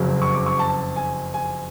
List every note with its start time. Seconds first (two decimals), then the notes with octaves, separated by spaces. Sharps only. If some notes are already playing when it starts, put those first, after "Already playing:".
Already playing: F#1 F2 C#3 F#3
0.22 C#6
0.34 D6
0.46 C#6
0.59 A5
0.96 G#5
1.34 G#5